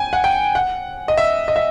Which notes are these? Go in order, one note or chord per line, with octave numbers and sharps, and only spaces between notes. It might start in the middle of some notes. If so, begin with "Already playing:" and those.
Already playing: G5 G#5
F#5
G5
F#5
D#5
E5
D#5
E5